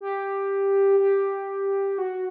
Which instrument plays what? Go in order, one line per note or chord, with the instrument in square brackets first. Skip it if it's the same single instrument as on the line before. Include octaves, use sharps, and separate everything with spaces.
[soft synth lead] G4
G4
F#4